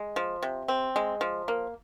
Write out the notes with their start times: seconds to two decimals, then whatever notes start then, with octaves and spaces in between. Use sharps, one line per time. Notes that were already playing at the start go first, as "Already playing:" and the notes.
Already playing: G#3
0.16 F3
0.43 C3
0.68 C4
0.96 G#3
1.21 F3
1.48 A#3